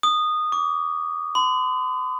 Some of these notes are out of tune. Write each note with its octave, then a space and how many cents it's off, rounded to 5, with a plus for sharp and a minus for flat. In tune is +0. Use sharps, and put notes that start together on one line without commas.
D#6 -15
D6 -35
C6 -45